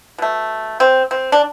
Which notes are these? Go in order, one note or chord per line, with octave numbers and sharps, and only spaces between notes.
B2 A3
C4
C4
D4